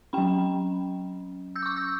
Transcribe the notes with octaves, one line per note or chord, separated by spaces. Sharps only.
F#3 C#4 G5 B5
E6 G6
D6
C#6 E6
E6 G6